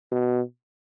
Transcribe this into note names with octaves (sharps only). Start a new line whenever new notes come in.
B2